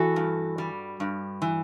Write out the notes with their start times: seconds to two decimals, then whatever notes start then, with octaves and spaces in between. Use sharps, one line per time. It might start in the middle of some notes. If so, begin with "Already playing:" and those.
Already playing: E3 F#4 A4
0.16 G2
0.58 G3
1.00 G2
1.42 E3